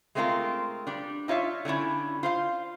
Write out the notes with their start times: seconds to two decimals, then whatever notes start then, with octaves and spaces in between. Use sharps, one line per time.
0.15 G#3 A3 C4 D#4 F4 A#4
0.87 G3 D4
1.28 D#4 F4 C#5 E5
1.65 D3 G3 C#4 E4
2.23 F4 C5 F5